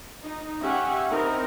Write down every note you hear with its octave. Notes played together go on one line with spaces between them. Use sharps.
D#4
C#4 G4 E5 F#5 G#5
C4 D#4 E4 A#4